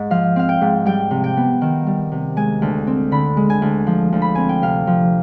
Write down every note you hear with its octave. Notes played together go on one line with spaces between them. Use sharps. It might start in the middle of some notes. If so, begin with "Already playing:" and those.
Already playing: G#2 D#5
F3 F5
C4 F5
G5
G#2
G3 G5
C3
G5
B3
D#3
G3
C3
G#3 G#5
D2
C4
D3 B5
G#3
G#5
D2
F3
D2
B5
C4 G#5
G5
C3 F5
F3